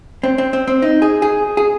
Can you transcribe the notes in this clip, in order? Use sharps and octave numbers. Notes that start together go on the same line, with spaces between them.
C4
C4
C4
C4
D#4
G#4
G#4
G#4